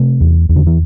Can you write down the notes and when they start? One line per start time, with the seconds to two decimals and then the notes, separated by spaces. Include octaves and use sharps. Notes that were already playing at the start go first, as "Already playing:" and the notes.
Already playing: C3 A3
0.21 E2
0.49 E2
0.56 D3
0.67 E3